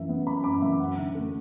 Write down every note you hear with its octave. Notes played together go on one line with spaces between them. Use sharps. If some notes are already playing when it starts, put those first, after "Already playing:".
Already playing: F#2 E3 E5
B3
F#2 B5 D6
F#2 B5 D6
E3 E5
F#2 F#5
D3
A3